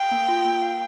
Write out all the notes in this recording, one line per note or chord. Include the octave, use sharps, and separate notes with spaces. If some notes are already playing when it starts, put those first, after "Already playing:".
Already playing: F5 G5
A#3
F4
A#3
F5